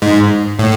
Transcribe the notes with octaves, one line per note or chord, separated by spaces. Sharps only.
G#2
A2